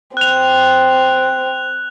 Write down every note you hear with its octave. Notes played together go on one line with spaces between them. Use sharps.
C4 F#6 F7